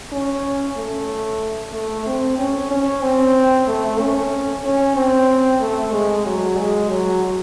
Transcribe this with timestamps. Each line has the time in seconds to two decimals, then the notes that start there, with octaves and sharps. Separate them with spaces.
0.12 C#4
0.77 A3
1.73 A3
2.06 C4
2.38 C#4
2.71 C#4
3.02 C4
3.68 A3
4.00 C#4
4.65 C#4
4.96 C4
5.61 A3
5.93 G#3
6.26 F#3
6.57 G#3
6.90 F#3